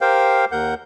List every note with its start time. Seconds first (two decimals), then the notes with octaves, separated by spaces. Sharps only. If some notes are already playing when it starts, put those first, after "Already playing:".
0.01 G4 A#4 C5 F5 G5
0.52 D#2 A#4 F#5 G6